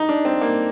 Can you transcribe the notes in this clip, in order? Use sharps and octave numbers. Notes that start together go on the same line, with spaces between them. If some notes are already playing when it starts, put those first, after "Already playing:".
Already playing: D#4
D4
C4
A#3